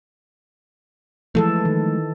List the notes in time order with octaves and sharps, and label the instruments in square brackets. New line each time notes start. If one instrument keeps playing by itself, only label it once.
[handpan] E3 A4 [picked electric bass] F3 G#3 A3
[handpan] D#3